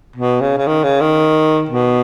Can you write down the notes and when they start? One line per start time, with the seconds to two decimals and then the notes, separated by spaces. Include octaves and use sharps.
0.16 B2
0.41 C#3
0.58 C#3
0.67 D#3
0.84 C#3
1.01 D#3
1.69 B2